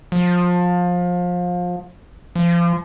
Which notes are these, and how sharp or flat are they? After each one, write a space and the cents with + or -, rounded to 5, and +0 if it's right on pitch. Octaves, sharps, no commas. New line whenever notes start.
F3 +25
F3 -25